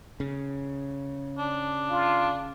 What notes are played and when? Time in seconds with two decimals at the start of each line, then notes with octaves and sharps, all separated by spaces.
0.20 C#3
1.38 D4
1.91 F4